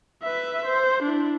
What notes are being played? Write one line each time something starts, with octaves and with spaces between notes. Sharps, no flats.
B4 E5
C5
D4 E4